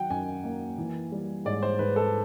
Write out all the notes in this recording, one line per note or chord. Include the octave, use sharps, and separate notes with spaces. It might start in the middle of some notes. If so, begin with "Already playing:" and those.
Already playing: D#3 F#3 F#5 G5
F#2 G#5
A#3
E3
G3
G#2 D5
C5
G#2 B4
A4